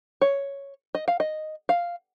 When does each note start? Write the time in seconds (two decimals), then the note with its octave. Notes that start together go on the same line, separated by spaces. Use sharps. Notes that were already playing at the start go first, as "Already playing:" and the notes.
0.21 C#5
0.95 D#5
1.08 F5
1.20 D#5
1.69 F5